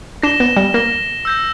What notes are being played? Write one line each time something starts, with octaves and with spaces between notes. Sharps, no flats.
D4 A#6 E7 G7
B3
G3
A#3 A#6 E7 G7
E6 G6 A#6